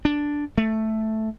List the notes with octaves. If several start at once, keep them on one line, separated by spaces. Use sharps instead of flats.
D4
A3